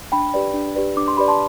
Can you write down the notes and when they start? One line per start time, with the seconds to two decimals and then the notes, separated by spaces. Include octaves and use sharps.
0.12 D4 G5 B5
0.34 G4 B4 D5
0.54 D4
0.76 G4 B4 D5
0.97 D4 D6
1.08 C6
1.17 G4 B4 D5 B5
1.28 A5 C6